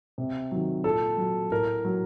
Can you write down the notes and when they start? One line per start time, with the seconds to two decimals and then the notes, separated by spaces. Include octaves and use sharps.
0.18 C3
0.52 D#3 F#3
0.84 A#2 A4
1.17 F#3
1.51 A2 A#4
1.85 F#3